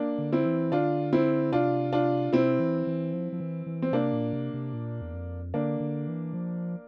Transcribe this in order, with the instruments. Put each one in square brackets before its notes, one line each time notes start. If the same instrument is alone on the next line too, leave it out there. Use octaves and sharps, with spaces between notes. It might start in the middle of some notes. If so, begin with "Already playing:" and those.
Already playing: [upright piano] A#3 D4
[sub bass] D3
[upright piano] C4 E4
[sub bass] E3
[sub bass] D3 [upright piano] D4 F4
[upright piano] C4 E4
[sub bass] C3 [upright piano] D4 F4
[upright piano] D4 F4
[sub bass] C3 [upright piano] C4 E4
[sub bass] E3
E3
F3
F3
E3
E3
[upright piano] C4
[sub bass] C3 [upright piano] A#3 D4
[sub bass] A#2
C3
C3
A#2
E2
F2
[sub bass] D3 [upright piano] A#3 D4
[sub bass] D3
E3
F3